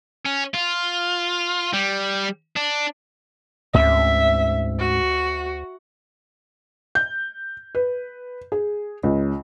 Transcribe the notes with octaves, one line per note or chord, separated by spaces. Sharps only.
C#4
F4
G3
D4
D2 G#2 C4 C#4 E5
F#4
G6
B4
G#4
C#2